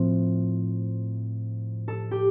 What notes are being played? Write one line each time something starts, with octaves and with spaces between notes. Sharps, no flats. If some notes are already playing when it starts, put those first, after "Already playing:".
Already playing: A2 F3 C4 C5
A4
G4